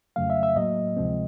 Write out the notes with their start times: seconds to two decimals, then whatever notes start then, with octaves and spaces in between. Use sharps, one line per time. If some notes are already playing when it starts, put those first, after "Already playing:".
0.16 F2 C#3 F#3 A3 F5
0.30 E5
0.43 E5
0.56 A2 F#3 A#3 D#5
0.97 D2 C3 F3 G#3 C4